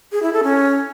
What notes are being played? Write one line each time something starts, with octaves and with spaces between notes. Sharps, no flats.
G#4
E4
A4
C#4